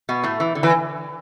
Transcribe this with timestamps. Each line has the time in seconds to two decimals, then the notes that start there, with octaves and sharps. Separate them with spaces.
0.09 B2 B3
0.24 A2 A3
0.40 E3
0.55 D3
0.63 E3